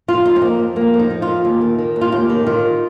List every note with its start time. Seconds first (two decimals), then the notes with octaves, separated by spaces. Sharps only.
0.08 F2 F4
0.25 F3 D#4
0.36 C4
0.42 F3 A#3
0.59 F2
0.76 F2 A#3
0.94 F3
0.99 D#4
1.10 F3
1.22 F4
1.28 F2
1.45 D#2
1.61 D#3
1.78 D#3
1.96 D#2
2.01 F4
2.12 D#2 G4
2.30 D#3
2.47 D#3 F4